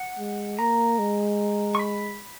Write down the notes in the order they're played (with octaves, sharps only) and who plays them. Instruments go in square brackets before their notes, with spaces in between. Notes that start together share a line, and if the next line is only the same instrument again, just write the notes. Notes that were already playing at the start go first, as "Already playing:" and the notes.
Already playing: [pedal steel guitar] F#5
[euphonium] G#3
[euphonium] A#3 [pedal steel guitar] A#5
[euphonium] G#3
[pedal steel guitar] C#6
B5